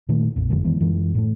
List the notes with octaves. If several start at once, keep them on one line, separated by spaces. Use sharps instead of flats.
A#2 D#3 A3
A#1 F2 A#2
F#1 F2 D3 G#3
D#3 E3 G#3 B3
F#2 E3 G#3
A2 A3